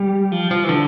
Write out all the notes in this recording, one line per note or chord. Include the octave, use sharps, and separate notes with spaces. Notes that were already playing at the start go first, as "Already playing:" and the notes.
Already playing: G3
F3
F3
E3
D3